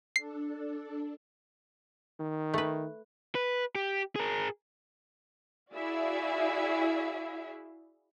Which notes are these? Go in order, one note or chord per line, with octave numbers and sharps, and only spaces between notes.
D4 A4 C7
D#3
A3 B4
B4
G4
G#4 A#4
E4 F#4 G#4 D5 E5 F5